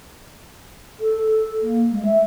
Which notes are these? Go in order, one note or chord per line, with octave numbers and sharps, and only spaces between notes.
A4
A4
A#3
G#3
E5